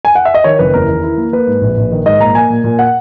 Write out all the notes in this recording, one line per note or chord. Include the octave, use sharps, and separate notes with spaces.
G#5
F#5
E5
D#5
D#3 C#5
F#1 B4
E2 A#4
D#3
E4
A#3
A#3 B4
G#2
A#1
A#1
D#3
G#2 D#5
A#2 A#5
A#3 G#5
A#2
A#2
F#5